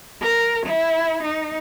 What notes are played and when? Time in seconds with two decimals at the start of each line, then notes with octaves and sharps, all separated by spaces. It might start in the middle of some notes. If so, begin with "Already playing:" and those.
0.22 A#4
0.66 E4
1.24 D#4